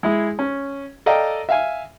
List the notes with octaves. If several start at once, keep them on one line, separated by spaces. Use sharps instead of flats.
G#3 E4 G#4
C#4
A4 D5 D#5 F5 G5 A#5
E5 F5 G#5